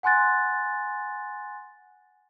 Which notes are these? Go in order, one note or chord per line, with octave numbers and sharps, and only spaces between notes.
F#5 G#5 C6 F#6 A6